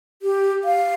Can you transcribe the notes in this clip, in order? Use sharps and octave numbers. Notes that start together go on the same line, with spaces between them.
G4
F5